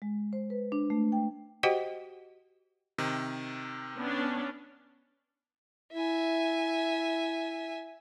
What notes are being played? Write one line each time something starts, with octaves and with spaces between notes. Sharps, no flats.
G#3
C5
B4
D4
A3
G5
F#4 G4 C5 D#5 F#5 G5
C3 D#3
B3 C#4 D4
E4 E5 G#5